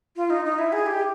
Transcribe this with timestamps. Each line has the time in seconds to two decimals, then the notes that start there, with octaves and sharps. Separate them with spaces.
0.16 F4
0.30 D#4
0.45 D#4
0.59 E4
0.73 G#4
0.87 G4